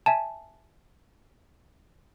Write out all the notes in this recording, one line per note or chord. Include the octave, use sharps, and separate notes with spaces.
E5 G#5 A5